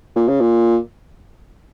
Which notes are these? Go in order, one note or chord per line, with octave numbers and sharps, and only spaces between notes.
A#2
C#3
A#2